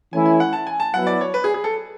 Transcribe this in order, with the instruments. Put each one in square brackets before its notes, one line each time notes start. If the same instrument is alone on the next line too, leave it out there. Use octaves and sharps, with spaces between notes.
[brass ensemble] E3 A3 C#4 E4 [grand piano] G#5
[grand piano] G#5
F#5
A5
G#5
A5
[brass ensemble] F#3 B3 E4 [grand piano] F#5
[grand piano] D5
C#5
B4
G#4
G#4
A4